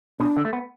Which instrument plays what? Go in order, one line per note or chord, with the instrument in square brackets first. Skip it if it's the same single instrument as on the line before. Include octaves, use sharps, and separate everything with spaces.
[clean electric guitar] B2 [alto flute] D4
[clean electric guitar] D3
A3
B3